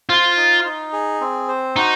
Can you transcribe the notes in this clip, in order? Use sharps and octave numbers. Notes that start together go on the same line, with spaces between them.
F4 C5
D#4
D#4
G#4
C4
C5
D#4 F#4